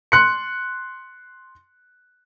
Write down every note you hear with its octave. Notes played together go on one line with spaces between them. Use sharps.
C6 F#6 C#7